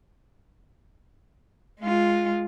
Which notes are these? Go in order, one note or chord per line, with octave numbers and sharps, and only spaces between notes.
G#3 F4